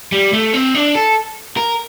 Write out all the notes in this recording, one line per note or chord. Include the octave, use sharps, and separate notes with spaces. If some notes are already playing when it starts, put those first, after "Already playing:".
G3
A3
C4
D4
A4
A#4